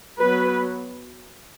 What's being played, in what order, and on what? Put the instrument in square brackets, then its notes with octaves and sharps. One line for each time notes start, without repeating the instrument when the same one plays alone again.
[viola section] F#3 B3 B4